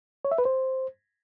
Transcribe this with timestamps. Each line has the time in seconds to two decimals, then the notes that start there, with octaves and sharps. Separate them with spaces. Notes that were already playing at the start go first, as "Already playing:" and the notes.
0.25 C#5
0.31 E5
0.38 B4
0.45 C5